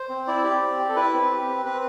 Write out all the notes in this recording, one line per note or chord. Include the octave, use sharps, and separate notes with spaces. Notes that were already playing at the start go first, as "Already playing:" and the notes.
Already playing: C5
C4
E4 D5
G4
C4
G4
A4
E4 B4
C4
G4
C4
C4 B4